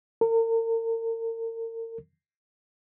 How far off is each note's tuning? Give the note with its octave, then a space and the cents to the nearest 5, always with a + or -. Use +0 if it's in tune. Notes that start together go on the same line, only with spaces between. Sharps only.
A#4 -40